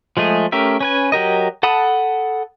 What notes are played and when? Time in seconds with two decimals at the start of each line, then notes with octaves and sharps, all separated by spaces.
0.17 F3 G#3 A3 G#4
0.52 A3 C#4 G4 A#4 E5
0.81 C#4 B4 G#5
1.12 F#3 G4 A#4 D#5
1.63 A4 F#5 A5 B5 D#6